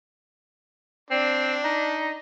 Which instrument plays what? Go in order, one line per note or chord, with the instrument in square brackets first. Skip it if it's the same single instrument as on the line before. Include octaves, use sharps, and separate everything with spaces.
[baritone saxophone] C4 [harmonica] D4
[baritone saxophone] D#4